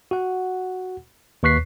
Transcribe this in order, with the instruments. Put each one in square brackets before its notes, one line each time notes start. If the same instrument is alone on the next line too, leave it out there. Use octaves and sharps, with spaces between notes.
[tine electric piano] F#4 F#5
D#2 B4 C#6 F#6 B6 C7